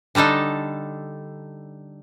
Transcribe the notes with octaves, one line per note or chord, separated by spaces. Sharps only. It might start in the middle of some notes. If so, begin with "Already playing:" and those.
D3 G3 D4 D#4 A4